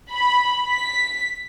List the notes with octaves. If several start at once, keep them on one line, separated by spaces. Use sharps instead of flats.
B5
B6